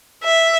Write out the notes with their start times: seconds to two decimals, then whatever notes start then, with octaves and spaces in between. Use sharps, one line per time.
0.24 E5